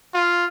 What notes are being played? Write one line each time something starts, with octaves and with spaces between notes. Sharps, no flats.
F4